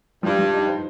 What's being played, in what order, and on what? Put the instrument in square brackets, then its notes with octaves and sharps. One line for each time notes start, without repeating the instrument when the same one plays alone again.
[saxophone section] G2 [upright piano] F3
[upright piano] F3
D#4
C5